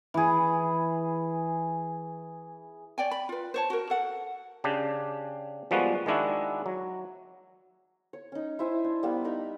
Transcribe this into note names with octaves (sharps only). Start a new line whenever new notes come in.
E3 G#4
C#5 D5 G5 G#5
B5
F4 B4
C5 C#5 A5
F#4 A#4
A4 F#5
C#3 D4 G4
F3 G3 G#3 A#3 B3 F#4
D#3 G#3 D4 E4 F#4
F#3
C#5
C#4 D#4
E4 C5 E5 G#5
D4
G3 A#3 B3
D#4 A#4 B5 E6